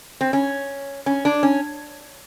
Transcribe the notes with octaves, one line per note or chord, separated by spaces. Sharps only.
C4
C#4
C#4
D4
C#4